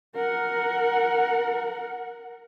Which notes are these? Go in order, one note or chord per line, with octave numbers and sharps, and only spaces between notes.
A#4 F#5